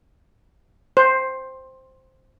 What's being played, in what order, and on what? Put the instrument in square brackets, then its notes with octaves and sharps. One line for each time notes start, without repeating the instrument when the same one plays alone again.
[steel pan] C5